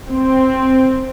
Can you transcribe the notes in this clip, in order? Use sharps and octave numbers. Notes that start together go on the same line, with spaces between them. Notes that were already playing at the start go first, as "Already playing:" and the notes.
C4